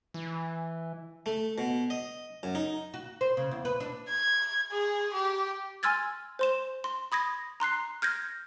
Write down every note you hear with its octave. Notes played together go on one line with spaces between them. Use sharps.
E3
A3
B2
D#5
F#2
D#4
F#4
C5
C#3
E2
B4
D4
G#6
G#4
G4
G#5 C6 E6 F6 G#6 A6
C5 C6 E7
C6
B5 D#6 G#6 A#6
A#5 C6 F#6 C7
F6 G6 G#6 A#6